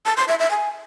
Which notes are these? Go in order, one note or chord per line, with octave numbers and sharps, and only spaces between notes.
A5
C6
E5
E5
G#5